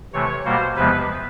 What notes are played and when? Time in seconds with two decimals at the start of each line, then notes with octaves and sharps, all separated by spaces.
0.13 C3 E3 A3 C#5
0.45 B2 G3 A#3 C5
0.76 E2 C3 F3 G#3 B3 B4